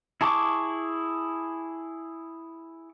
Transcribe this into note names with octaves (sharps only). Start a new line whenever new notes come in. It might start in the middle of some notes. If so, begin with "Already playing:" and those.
E4 G#4 A5 C#6 D6